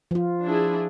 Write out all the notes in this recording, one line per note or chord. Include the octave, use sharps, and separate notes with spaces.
F3 F4
D4 E4 G#4